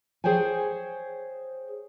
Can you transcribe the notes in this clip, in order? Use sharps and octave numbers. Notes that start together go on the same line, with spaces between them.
G#4 C5 C#5 G5 G#5